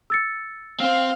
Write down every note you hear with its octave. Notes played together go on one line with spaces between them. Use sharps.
E6 A6 C#7
C4 C5 F5